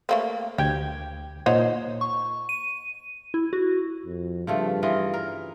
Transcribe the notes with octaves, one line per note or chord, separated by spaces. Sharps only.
A3 A#3 C4
D2 G4 G5 G#6
A#2 D#4 C5 C#5 F#5
C#6
D#7
E4
F#4
F2
G2 C#3 F3 A3
E3 F4 D#5
A#4